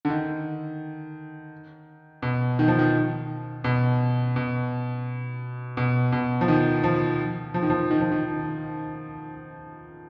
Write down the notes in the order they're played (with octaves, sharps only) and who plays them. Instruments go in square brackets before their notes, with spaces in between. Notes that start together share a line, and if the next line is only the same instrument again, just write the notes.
[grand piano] D3
D#3
B2
D#3
F3
D#3
B2
B2
B2
B2
F3
D#3
F3
F3
D#3
F3
D#3
F3
D#3